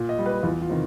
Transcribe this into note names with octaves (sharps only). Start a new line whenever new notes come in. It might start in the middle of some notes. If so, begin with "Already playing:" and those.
Already playing: A#2
D#5
G3
B4
E2 F4
F4
C3 D#3